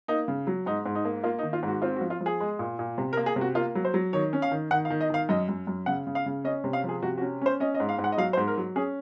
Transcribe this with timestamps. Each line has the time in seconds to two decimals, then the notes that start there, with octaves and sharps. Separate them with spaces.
0.08 A#3 D#4
0.28 C#3
0.47 F#3
0.66 G#2 D#4
0.86 G#2
0.95 D#4
1.05 A#3
1.23 A#3 F4
1.39 D#4
1.43 D#3
1.53 F4
1.63 G#2
1.68 F#4
1.82 C4 F4
1.96 F#4
2.01 F3
2.10 F4
2.21 F3
2.26 G#4
2.40 G#3
2.59 A#2
2.79 A#2
2.98 C3
3.13 A#4
3.17 A#3
3.26 G#4
3.36 C3
3.41 F#4
3.55 A#3 F4
3.75 F#3
3.85 C5
3.94 F#3
4.13 D#3 C#5
4.33 C#4
4.42 F5
4.51 D#3
4.71 D#3 F#5
4.85 F5
4.90 D#3
5.01 D#5
5.10 D#3 F5
5.29 F#2 D#5
5.49 F#2
5.67 F#2
5.86 C#3 F#5
6.07 C#3
6.15 F5
6.26 C#3
6.44 C#4 D#5
6.64 C3
6.73 F5
6.84 F3 G#4
7.02 C3 F#4
7.18 F#4
7.21 C#4
7.41 C#4 C5
7.60 C#4 D#5
7.75 D#5
7.80 G#2
7.89 F5
7.98 G#2
8.04 F#5
8.12 D#5
8.18 F#3 F5
8.33 C5
8.37 G#2
8.48 A#4
8.57 F#3
8.76 C#4 G#4